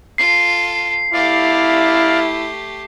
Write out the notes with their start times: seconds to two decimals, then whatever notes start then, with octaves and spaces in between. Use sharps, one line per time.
0.18 F4 A4 C7
1.13 A3 E4 G4 D5 F5